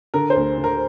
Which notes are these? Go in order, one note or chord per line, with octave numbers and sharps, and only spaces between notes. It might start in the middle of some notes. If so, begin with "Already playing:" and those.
D3 A#4
C5
D2
D3
A#4